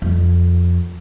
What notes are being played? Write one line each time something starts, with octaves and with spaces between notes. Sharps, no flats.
F2